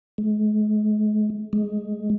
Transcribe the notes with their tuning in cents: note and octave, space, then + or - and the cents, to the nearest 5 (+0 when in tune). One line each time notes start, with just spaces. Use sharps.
G#3 +40
G#3 +10